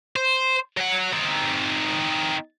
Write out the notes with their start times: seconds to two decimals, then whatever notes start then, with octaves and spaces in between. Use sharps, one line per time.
0.16 C5
0.77 F#3 F#5
1.13 C4 D#4